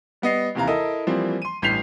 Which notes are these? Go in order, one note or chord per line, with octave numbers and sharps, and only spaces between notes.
G3 B3 D#5 C7
D#2 C3 E3 F5 A#5
E4 A4 A#4 D#5
E3 F3 G3 A#3 C4
C6 D#7
A1 G2 G6 B6 C7 F7